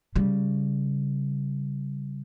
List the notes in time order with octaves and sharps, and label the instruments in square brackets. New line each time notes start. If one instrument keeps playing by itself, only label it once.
[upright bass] C#3 G3